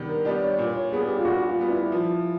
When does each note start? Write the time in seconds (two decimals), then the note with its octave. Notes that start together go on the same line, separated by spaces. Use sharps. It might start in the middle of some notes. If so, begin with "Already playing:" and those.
Already playing: D#3 G3 B3 D4
0.08 A#4
0.25 G3 B3 D4 G4 D5
0.42 C#5
0.58 A#2
0.76 C#5
0.92 G3 B3 G#4
1.08 G4
1.18 F4
1.25 A#2 F#4
1.48 F4
1.59 G3 B3
1.70 E4
1.92 F3